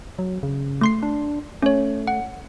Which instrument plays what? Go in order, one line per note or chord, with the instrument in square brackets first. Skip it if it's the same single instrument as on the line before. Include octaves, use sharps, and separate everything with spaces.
[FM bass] F#3
C#3
[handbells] A3 C6 C7
[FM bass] D4
[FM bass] A3 [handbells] C#4 C#5
[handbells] F#5